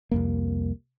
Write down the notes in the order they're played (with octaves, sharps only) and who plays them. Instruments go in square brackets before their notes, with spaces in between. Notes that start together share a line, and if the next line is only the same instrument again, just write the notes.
[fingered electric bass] C2 F2 A#3